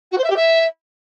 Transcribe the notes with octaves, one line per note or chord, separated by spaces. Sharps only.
F#4
C5
E5
G4
E5